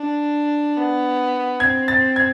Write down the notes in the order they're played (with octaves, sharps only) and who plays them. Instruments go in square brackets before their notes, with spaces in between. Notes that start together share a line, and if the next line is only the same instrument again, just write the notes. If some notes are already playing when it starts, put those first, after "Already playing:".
Already playing: [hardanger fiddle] D4
B3
[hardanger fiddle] C4 [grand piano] G#6
[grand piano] A6
G#6